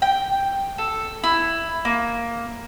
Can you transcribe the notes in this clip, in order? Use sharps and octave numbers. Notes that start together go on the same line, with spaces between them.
G5
A4
E4
A#3